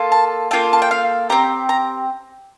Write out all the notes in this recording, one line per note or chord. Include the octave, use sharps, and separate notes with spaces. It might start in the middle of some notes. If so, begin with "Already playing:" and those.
Already playing: A#3 F4 A4
A5
A#3 F4 A4 G5
A5
G5
F5
C4 G4 A#5
A#5